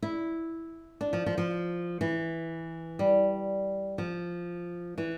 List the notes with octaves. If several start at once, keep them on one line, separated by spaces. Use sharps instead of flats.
E4
D4
F3
F3
F3
E3
G3
F3
E3